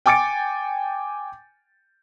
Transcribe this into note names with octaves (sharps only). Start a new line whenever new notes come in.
G5 G#5 D6 A6 C#7 D7